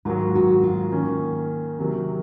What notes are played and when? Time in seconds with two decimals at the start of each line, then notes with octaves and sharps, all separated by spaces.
0.05 G#2 D#3 F#3 F4
0.35 F#4
0.63 F4
0.92 D#3 A#3 C#4
1.79 C3 D#3 F#3